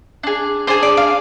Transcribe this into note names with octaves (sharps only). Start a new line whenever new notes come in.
D4 G#4
D4 G#4 C5
D5
F5